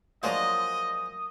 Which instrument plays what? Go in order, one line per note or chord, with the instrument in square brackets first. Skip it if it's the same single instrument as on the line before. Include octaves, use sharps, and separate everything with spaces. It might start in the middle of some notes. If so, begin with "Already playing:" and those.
[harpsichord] F3 G#3 D5 [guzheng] F#3 A#3 F4 [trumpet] D#5 [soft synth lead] D#6